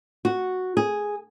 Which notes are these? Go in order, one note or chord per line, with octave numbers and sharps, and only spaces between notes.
F#4
G#4